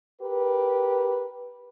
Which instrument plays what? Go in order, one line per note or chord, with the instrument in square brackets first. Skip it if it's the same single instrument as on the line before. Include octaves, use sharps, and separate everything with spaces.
[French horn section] G4 A#4 B4